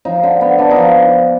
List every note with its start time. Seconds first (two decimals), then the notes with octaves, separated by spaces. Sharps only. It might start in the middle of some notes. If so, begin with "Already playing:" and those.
0.05 F3 D#4
0.24 D3
0.41 B3
0.59 D3 D4
0.71 D#4
0.76 F3